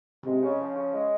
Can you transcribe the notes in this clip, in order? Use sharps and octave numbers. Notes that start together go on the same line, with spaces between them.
C3 G#3
C#3
F3
C#3
G#3